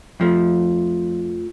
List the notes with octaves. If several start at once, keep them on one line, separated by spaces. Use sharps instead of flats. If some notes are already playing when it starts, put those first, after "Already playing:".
F2 F3 A3